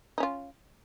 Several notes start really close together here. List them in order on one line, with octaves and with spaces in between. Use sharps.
D#4 C#4 F4